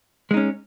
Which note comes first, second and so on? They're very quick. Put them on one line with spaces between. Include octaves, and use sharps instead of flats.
G#3 D#4 C#4